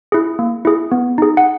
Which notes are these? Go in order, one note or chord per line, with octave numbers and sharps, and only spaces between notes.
E4 G#4
A#3
E4 G#4
B3
D#4 G#4
F#5